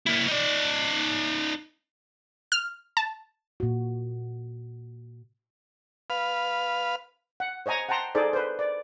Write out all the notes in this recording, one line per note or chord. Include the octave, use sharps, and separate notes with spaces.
A#3 E4
D#4 D5
F6
A5
A#2 F#4
B4 F5
F#5
C5 C#5 D#5 G#5 A#5
F#5 G5 A5 A#5 C6
D#4 G#4 A4 C5 D5
B4 C5
D5